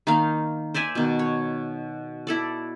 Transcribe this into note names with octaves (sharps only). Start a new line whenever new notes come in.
D#3 A#3 D#4 F5
C5 D5 E5 G#5
B2 D#3
C#5
E4 A4 D5